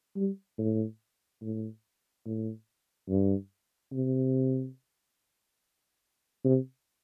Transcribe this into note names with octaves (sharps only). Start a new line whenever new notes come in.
G3
A2
A2
A2
G2
C3
C3